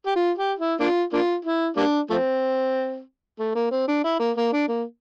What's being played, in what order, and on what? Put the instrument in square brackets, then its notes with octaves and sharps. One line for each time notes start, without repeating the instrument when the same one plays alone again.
[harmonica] G4
F4
G4
E4
A#3 D4 F4
A#3 D4 F4
E4
G3 A#3 D4
F3 A3 C4
A3
A#3
C4
D4
E4
A#3
A#3
D4
A#3